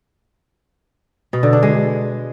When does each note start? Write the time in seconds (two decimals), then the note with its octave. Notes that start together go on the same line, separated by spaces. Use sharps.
1.33 B2
1.43 D3
1.53 D4
1.63 G#3